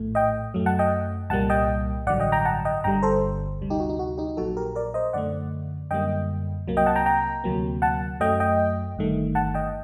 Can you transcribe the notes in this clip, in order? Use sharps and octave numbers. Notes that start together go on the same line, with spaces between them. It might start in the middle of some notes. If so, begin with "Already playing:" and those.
Already playing: A#1 A2 A3
D#5 G5
F#2 F#3 A3
F#5 A5
D#5 G5
C2 A#2 G3 A#3 F#5 A5
D#5 G5
A1 G2 D3 F#3 D5 F#5
D#5 G5
G5 A#5
F#5 A5
D#5 G5
G1 G2 D3 G3 G5 A#5
A4 C5
D2 C3 G3
D#4 G4
F#4
D#4
F#4
D#4 G4
A#1 A#2 F#3 F#4 A4
G4 A#4
A#4 D5
C5 D#5
F#2 D3 A3 D5 F#5
F#2 D3 G3 A#3 D#5 G5
C2 C3 F#3 A#3
D#5 G5
F#5 A5
G5 A#5
G5 A#5
D2 C3 F#3 A#3
F#5 A5
F#2 F#3 A3 D#5 G5
D#5 G5
G1 G2 D#3 A3
F#5 A5
D#5 G5